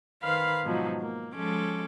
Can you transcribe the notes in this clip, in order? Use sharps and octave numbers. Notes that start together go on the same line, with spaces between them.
D#3 B4 C5 F5 B5 F6
G#2 B2 F3 F#3 D#4
A#3
F3 G#3 C#4 A4 D6